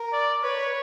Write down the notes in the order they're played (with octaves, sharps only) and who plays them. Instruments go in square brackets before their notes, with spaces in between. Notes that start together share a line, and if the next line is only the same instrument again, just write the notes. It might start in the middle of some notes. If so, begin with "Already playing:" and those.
Already playing: [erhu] A#4
[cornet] D5
[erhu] B4 [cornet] C#5